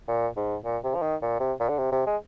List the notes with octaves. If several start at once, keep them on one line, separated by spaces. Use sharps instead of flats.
A#2
G#2
A#2
C3
F3
D#3
A#2
C3
A#2
D3
C3
C3
G#3